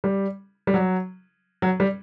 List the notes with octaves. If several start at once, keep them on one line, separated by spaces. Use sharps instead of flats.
G3
G3
F#3
F#3
G3